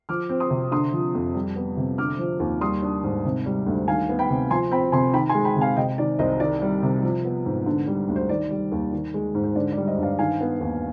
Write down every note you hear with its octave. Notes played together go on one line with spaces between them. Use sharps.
F3 D6 F6
C4
C6 D#6
C3
D3 C6 D#6
F3
F2
G3
B3
C3
D3 D6 F6
F3
D#2
G3 C6 D#6
D4
G#2
C3
G3
D2
D#3 F5 G#5
B3
G5 B5
C3
F3 G#5 C6
C4 G5 B5
C3 G#5 C6
D#3 G5 B5
G#5 C6
G#3
G5 B5
C3
F5 G#5
C3 D#5 G5
D#3 D5
C2 C5 D#5
D#3 D5
G3
C3
F3
B3
G#2
D3
G3
D2
C5
D#3 D5
G3
D#2
D#3
G#3
G#2
C5
D3 D5
D5
G3
C5 D#5
G2
D5 F5
D#3 F5 G#5
B3
D#2